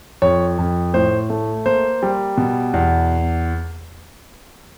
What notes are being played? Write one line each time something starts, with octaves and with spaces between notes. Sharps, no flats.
F2 C#5
F2
A2 C5
A3
A#3 C5
G3
B2
E2